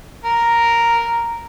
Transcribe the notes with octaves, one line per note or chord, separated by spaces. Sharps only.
A#4